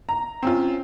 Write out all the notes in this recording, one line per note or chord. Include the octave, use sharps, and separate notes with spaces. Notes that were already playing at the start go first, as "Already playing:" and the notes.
A#5
C4 C#4 F4